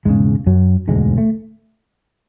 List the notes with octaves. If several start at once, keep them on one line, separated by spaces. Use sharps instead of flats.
E1 D2 G#2 C#3 G#3
F#2 F#3
E1 D2 G#2 D3 G#3
A3